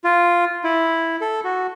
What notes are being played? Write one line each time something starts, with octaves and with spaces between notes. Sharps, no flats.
F4
E4
A4
F#4